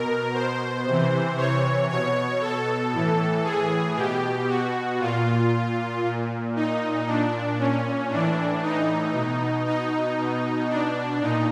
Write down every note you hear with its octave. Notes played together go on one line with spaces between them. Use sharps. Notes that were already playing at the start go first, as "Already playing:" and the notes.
Already playing: B2 A#4
C5
C3 E3
C#5
B2 C#5
A4
A2 E3
G#4
B2 G4
F#4
A#2 F4
A#2
D#4
A#2 D4
C#4
A2 E3 D4
D#4
B2
D#4
B2
D4
A#2 D#4